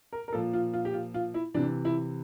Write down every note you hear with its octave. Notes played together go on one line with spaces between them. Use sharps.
A#4
A#4
A#2 F3 A4
F4
F4
G4
F4
F4
E4
C3 E3 D4
E4